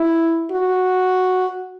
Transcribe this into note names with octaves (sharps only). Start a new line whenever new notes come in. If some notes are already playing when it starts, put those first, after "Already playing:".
Already playing: E4
F#4